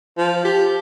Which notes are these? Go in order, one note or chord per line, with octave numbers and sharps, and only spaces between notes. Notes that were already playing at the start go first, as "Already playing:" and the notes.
F3
G4